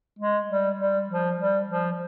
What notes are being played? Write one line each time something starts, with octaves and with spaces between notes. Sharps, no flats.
G#3
G3
G3
F3
G3
F3